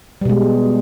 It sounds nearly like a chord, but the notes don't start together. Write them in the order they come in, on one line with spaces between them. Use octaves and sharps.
G3 B2 G#3